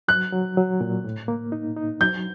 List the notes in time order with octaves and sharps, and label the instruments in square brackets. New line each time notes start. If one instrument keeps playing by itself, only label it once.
[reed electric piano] F#3 [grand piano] F#6
[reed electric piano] F#3
F#3
A#2
A2
A#3
D#4
D#4
[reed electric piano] F#3 [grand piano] G6